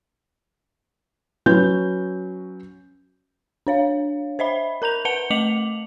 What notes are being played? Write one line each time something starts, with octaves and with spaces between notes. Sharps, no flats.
F#3 C#4 B4 G6
D4 C#5 F5
C5 D#5 E5 B5
A#4 A#5 G6 F7
B4 F#5 A5 C#7 G7
A3 D#5 D6 C#7 F7 F#7